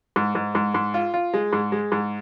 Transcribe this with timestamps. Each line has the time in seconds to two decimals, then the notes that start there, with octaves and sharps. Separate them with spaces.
0.16 G#2
0.35 G#2
0.55 G#2
0.74 G#2
0.94 F4
1.14 F4
1.34 G#3
1.53 G#2
1.72 G#3
1.92 G#2